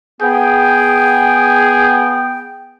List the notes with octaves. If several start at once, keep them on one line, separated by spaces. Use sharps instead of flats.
B3 G#4 G5